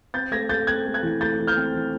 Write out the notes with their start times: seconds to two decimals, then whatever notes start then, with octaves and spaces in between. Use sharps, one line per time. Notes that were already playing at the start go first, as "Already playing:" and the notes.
0.14 C4 G6 A6
0.31 A3 G#6 A#6
0.49 A3 G6 A6
0.67 C4 F#6 G#6
0.86 A3
0.94 F#6 G#6
1.03 E3
1.21 A3 G6 A6
1.39 E3
1.47 F6 G6
1.57 C4
1.74 E3